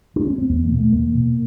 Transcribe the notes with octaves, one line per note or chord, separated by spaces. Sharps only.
D4
C#4
C4
E2 B3
A#3
B2
A3
E2 A#3
B2